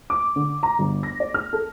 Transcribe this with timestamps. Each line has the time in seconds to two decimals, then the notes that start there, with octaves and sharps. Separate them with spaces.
0.10 D6
0.36 D3
0.63 A#5
0.79 G1
1.03 A#6
1.20 D5
1.34 F6
1.53 A4